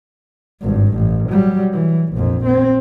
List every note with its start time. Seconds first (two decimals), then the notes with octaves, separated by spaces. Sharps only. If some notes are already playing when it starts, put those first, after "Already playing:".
0.61 G#1 G2
0.93 A1
1.29 F#3 G3
1.73 E3
2.14 A#1 F2
2.45 C4